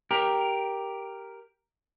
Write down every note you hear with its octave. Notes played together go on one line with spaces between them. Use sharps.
G4 A#4